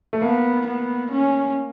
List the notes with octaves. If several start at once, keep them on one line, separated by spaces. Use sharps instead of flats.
A3
A#3 B3
B3
C#4